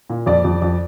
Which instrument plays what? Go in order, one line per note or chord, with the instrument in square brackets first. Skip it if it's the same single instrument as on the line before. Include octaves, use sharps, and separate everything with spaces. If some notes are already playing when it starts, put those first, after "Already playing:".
[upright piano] A#2
F2 D5
F2
F2